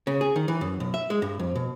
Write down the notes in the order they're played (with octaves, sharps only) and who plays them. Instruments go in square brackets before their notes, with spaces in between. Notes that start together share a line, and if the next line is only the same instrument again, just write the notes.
[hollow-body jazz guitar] C#3
G#4
D#3
E3
F#2
B1
E5
G#3
G2
F2
B2